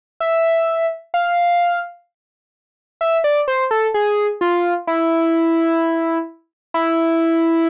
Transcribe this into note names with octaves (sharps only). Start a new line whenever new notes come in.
E5
F5
E5
D5
C5
A4
G#4
F4
E4
E4